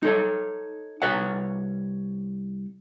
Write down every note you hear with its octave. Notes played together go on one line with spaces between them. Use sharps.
D#4 A4 C#5
C2 B4 C#5 F#5